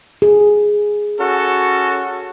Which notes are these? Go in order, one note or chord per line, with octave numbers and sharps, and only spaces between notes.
G#4
C#4 F#4 A4